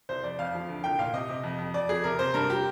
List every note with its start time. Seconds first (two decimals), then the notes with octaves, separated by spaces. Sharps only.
0.09 C2 C5
0.23 F2 D5
0.39 F2 F5
0.55 F3
0.69 D2
0.84 C2 G5
0.99 A#2 F5
1.13 C3 D#5
1.29 C3
1.43 F2
1.58 F2
1.74 F2 D5
1.89 F2 G#4
2.04 C3 A#4
2.19 C3 C5
2.34 G2 A#4
2.50 G4